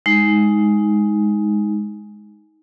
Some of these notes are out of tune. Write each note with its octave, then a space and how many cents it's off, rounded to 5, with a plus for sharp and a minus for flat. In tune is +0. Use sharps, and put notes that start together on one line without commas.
G#3 +0 D#4 +15